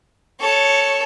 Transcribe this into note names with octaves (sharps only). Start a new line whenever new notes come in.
A4 C#5